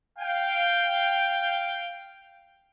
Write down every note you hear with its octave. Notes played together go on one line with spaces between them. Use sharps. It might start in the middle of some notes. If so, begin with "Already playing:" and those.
F5 G5